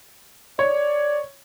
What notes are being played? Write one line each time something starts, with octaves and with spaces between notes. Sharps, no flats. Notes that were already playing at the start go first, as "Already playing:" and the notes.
C#5 D5